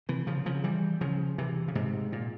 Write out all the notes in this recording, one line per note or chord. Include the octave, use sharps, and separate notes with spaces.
C3 E3
C#3 F3
C#3 F3
E3 G3
C#3 F3
C3 E3
C#3
G#2 C3
A#2